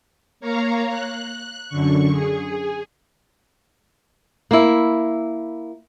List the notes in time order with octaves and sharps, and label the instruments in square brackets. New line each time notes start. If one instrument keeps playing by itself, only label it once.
[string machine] A#3 C#5 F5 A#5
F#6
F#2 D3 C#6
G#4
[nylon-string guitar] A#3 E4